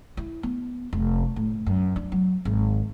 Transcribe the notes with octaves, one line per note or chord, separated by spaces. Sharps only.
E4
B3
F1
A2
F#2
D4
F#3
G#1